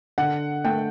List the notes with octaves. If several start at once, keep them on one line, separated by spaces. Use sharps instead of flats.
D3 F#5
A3 G5